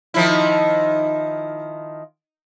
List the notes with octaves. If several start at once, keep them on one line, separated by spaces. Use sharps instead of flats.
D#3 F3 E4